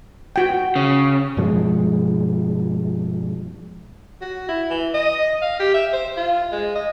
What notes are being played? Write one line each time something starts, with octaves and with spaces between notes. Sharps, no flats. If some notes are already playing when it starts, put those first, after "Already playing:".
F#4 G5
C#3
G2 B2 F3 G#3
F#4
E4
E3
D#5
F5
G4
E5
C5
F4
G#3
D#5